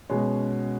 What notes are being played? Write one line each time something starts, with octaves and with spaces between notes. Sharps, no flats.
B2 G#3 C#4